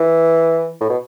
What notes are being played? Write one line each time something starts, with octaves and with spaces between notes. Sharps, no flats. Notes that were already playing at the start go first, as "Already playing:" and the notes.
Already playing: E3
A2
B2